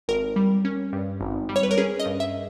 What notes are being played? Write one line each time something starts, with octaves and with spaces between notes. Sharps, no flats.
G#1 A#4
G3
C#4
G2
G#1
G3
C#5
B4
A#4
C#4 G#4
D#5
G2
E5